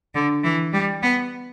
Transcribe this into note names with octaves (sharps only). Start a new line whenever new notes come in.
D3
E3
G3
B3